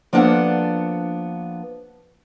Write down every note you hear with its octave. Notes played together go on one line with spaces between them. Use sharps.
F3 A#3 B3 D4 A4 F#5